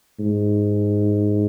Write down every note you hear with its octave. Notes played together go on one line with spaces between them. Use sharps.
G#2